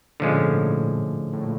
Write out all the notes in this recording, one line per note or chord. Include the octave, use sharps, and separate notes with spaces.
A#2 D3 F3 G#3 C#4
A2
G#2
A2
A2
A#2